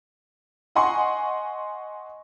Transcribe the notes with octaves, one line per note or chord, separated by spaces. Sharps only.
D#5 F#5 G#5 C6 C#6